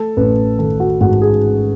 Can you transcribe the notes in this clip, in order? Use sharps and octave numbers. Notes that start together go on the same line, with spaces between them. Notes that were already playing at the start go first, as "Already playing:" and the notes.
Already playing: A3 A4
A1 B4
D#3 A4
F#4
G#2 F#4
G#4